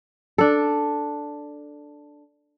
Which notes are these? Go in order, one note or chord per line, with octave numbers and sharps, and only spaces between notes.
D4 A4